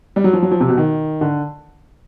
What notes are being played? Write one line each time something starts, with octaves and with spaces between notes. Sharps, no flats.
G3
F#3
F3
F#3
F3
C3
B2
D#3
D3